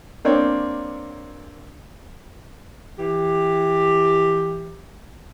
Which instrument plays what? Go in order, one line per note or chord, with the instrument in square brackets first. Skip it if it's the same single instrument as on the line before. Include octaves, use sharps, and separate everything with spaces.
[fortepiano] A#3 C4 D4 C#5
[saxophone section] E3 G4